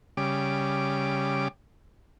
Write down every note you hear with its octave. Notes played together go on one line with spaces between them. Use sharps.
C#3 G3 D6